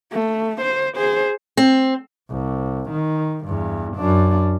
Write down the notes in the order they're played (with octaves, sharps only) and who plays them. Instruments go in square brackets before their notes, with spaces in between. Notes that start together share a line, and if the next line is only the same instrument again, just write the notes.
[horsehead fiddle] A3
C5
G#4 C5
[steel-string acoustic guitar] C4
[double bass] C2
D#3
E2 G2
F#2 D4